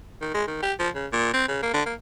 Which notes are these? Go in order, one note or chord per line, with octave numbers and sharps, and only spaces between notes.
D#3
G#3
D#3
G4
F3
C#3
A#2
C4
C#3
A#3
D3
A#3